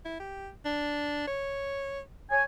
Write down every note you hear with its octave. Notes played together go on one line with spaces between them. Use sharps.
E4
G4
D4
C#5
C#5 G#5